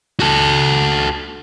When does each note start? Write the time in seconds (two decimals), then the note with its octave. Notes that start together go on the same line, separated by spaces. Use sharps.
0.20 F#4 A4